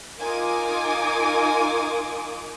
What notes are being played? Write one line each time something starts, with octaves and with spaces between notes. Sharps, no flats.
D#4 F4 A#4 G#5 D6 D#6